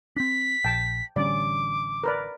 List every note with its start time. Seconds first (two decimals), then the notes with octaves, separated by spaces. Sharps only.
0.17 C4 D4 B6
0.65 A#1 G5 A5
1.16 A1 D3 G3 C#4 D5 D6
2.04 A#4 B4 D5